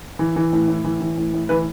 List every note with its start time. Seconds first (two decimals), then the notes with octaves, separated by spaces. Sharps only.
0.19 E3
0.36 E3
0.53 A2
0.68 A2
0.84 E3
1.01 E3
1.17 A2
1.34 A2
1.49 E3 B4